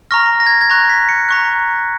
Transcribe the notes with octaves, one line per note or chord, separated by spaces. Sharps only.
A#5 C#6 F6 A#6
A#6
G#6
G#6
A#5 C#6 F#6 A#6
B6
C#7
A#5 C#6 F#6